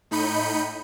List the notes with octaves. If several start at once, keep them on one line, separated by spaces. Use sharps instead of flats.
A2 D#4 B5 G6 C#7 D#7